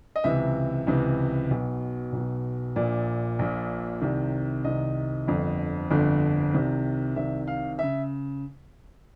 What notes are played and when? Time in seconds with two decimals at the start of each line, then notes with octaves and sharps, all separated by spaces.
0.16 D#5
0.24 C#2 C3 E3 E5
0.87 C#2 C3 E3
1.51 B1 B2
2.13 B1 B2
2.76 A#1 A#2 D5
3.39 A#1 A#2
4.01 C2 C3 D#3
4.64 C2 C3 D#3 D#5
5.27 G1 F2 D3
5.91 G1 F2 D3
6.54 C2 C3 D#3
7.16 C2 C3 D#3 E5
7.47 F5
7.79 C#3 E5